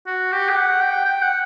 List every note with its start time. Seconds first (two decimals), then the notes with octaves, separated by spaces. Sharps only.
0.07 F#4
0.32 G4
0.50 G5
0.56 F#5
0.81 G5
1.05 G5
1.22 F#5